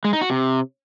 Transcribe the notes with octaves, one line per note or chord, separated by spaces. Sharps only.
G#3
D#4
F#4
C3